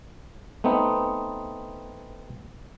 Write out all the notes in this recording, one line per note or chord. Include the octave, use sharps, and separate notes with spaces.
A3 B3 C4 D#4